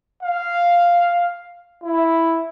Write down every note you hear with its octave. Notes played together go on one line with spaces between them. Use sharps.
F5
E4